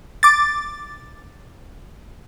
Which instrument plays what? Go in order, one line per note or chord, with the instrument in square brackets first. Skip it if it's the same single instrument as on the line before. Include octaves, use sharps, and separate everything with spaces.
[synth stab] D6 A6